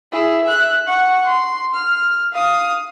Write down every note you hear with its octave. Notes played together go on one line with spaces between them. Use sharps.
E4 G#4
E5 F#6
F#5 C#6
C6
F6
F5 D#6